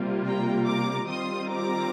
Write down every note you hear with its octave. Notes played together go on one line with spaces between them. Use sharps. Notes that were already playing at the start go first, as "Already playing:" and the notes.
Already playing: C3 G3 A#3 F4
G5 A#5
A#5 D6
D#3 G3 C4 F4 C6 D#6
A#5 D6